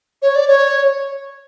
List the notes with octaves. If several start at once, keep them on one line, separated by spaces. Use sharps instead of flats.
C#5
D5
C#5